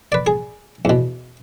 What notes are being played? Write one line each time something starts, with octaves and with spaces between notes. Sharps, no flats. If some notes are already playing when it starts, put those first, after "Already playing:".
B4 D5
G#4
E2 B2